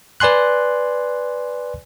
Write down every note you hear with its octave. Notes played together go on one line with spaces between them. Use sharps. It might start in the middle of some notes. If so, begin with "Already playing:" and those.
B4 D5 G#5 C6 F#6